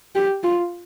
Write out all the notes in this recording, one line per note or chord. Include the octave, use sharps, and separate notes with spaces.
G4
F4